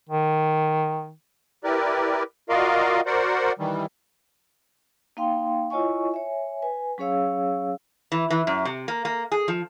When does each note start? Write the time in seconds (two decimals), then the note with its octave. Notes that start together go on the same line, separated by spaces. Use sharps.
0.09 D#3
1.64 E4 G4 A#4 B4 D5
2.49 F4 F#4 A#4 D5 D#5 F5
3.06 F#4 A#4 C5 D5 F#5
3.59 D#3 E3 G3
5.17 A#3 D#4 F5 G5 C6
5.70 E4 F4 C#5 D#5 G#5 C#6
6.12 C#5 E5 G#5
6.62 B4 G#5
6.98 F#3 C#4 G#4 C#5 F5 E6
8.12 E3
8.30 E3
8.47 F#2
8.65 C3
8.88 A#3
9.05 A#3
9.32 G#4
9.48 F3